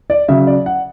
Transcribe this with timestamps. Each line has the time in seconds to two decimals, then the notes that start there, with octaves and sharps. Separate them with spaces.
0.10 D5
0.28 C#3 F#3 E5
0.47 D5
0.66 F#5